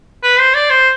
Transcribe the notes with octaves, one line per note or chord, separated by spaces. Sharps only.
B4
C5
D5
C5